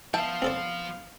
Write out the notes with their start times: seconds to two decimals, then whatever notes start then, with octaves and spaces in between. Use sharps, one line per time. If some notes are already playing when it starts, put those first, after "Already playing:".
0.14 F3 B3 E5 F5 G5 A5
0.42 C4 A4 D5